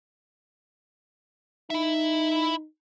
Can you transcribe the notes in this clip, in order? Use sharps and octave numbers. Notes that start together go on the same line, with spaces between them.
D#4 E4 E5